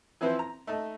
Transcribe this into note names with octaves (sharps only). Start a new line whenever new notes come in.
E3 F3 C4 E4 B4 C5
A#5
A3 D#4 A4